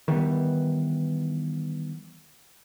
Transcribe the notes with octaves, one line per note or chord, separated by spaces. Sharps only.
D#3 E3 G3 B3